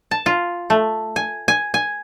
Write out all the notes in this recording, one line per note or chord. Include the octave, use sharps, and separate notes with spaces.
A5
F4
A3
G#5
G#5
G#5